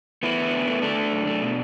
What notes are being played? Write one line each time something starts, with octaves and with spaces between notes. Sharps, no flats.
A3 B3 E4
D3
A3
A3
D3 A3 D4
D3
F#2
A3
B2